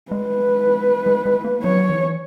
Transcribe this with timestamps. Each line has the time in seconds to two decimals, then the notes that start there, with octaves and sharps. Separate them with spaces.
0.11 G#3 B4
1.06 G#3
1.26 G#3
1.44 A#3
1.64 F#3 C#5
1.90 E3